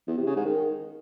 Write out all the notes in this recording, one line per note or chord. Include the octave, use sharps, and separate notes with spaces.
E2
C3
C#3
G#2
D#3